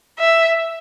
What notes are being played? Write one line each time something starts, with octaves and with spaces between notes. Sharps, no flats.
E5